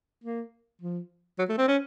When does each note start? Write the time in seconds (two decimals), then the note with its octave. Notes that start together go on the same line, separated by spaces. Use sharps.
0.24 A#3
0.82 F3
1.39 F#3
1.49 A3
1.58 C4
1.68 C#4